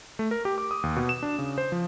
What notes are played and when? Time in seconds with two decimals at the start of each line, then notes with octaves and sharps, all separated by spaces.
0.19 A3
0.31 A#4
0.45 G4
0.58 D6
0.71 D#6
0.83 D#2
0.96 B2
1.09 E7
1.23 D4
1.38 C#3
1.58 C5
1.72 F3